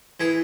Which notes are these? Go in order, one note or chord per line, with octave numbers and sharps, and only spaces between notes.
E3 G#4